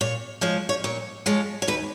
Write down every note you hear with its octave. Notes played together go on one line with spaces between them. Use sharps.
A#2 C#5
F3 G#3 C#5
C#5
A#2 C#5
F3 G#3 C#5
C#5
D#2 B4